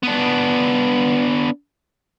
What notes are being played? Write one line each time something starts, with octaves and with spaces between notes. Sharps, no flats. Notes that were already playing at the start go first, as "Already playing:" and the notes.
B3 D4